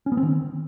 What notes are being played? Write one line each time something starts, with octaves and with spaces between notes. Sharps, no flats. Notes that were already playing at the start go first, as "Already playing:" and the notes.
C#4
B3
C4
D#3